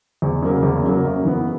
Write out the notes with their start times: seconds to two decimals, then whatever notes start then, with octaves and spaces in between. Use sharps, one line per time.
0.22 E2
0.42 C#3 F#3 A#3
0.63 E2
0.83 C#3 F#3 A#3
1.05 F#2
1.25 E3 B3